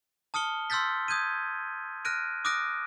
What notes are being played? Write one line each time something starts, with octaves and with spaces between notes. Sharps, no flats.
A5 D#6 F6 C#7 G7
C6 E6 F6 G6 A6 B6
D#6 G6 G#6 D#7
F6 F#6 A#6 D7 D#7
D6 D#6 F6 F#6 A#6 D7